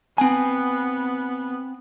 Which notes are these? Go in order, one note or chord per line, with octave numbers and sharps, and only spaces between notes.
B3 C4 G#5